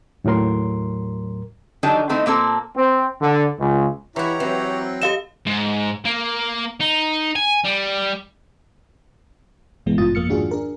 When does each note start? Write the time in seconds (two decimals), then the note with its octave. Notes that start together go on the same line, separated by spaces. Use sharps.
0.24 D#2 A2 F#3 A#4 C6
1.83 D#3 F#3 D4 D#4 G4 A4
2.09 D#3 A3 C4 D#4 E4
2.26 A#2 A#3 C4 A4
2.77 C4
3.22 D3
3.59 C#2
4.16 E3 E4 F#4 G4 C#5 A#5
4.40 E3 F#3 C4
5.01 G4 A4 D#5 F5 E7
5.46 G#2
6.05 A#3
6.80 D#4
7.36 G#5
7.65 G3
9.86 G1 B2 E3 G#3 B3
9.98 G#1 G2 B2 F4 D#6 A6
10.15 F2 A#3 F6 C#7
10.29 G#2 D#3 D4 F4 F#4 G#4
10.51 D4 G#4 A#4